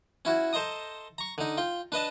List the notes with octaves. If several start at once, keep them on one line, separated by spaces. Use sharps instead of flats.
C#4 E4 F#4
A4 C5 D#5 A#5 D#6
A#5 C#6
D3 D#4
F4 G5
D4 B4 D#5 A5